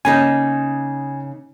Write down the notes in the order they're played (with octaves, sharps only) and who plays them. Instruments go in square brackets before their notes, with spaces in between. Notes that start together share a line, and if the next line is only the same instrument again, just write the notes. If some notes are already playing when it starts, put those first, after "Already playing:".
[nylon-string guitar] C#3 A#3 D#4 [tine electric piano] G#5